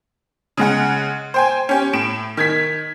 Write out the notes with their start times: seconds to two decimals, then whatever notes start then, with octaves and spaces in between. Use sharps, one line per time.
0.57 C#3 G#3 F#5
1.34 C5 G5 G#5
1.69 C#4 G4
1.93 A2 D7 E7
2.37 D#3 G#6 B6